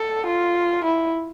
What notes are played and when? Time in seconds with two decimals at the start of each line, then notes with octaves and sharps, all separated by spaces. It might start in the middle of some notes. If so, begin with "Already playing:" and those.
Already playing: A4
0.26 F4
0.85 E4